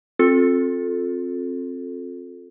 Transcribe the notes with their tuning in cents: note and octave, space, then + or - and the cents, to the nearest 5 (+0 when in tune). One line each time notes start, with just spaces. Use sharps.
C4 +20 F4 +35 A4 +0